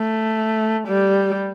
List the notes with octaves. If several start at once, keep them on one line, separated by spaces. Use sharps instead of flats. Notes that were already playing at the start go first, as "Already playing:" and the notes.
Already playing: A3
G3